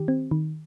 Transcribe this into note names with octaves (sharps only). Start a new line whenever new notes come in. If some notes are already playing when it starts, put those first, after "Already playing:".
Already playing: D#3 G4
C4
D#3